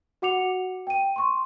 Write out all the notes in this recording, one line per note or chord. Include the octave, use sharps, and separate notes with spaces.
F#4 F#5 D6 C#7 F7
G5 D#7
C6 C#6